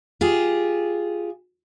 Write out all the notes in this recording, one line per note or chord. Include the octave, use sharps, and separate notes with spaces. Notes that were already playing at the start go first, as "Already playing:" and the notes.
F4 G4 G#4